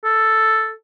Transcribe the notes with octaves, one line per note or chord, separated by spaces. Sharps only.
A4